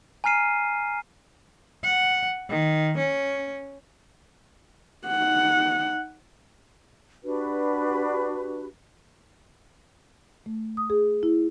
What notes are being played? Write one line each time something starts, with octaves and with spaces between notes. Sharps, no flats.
G#5 A#5 F6 C7 D#7
F#5
D#3
C#4
D#4 F#5
D4 F#4 G4 B4
A3
D#6
G#4
E4